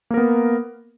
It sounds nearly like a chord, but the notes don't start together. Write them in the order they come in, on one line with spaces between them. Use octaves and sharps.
A#3 A#4 B3